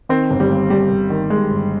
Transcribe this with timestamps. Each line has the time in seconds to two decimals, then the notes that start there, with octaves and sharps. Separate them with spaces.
0.09 D#3 C4
0.30 G1
0.40 G3
0.50 G2
0.70 G2 G3
0.90 G1
1.10 D#3
1.30 G2 G#3
1.51 G1